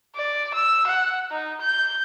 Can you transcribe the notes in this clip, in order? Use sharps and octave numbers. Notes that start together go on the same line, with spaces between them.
D5
E6
F#5
D#4
G6